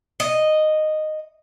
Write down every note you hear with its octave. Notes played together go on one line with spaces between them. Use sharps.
D#5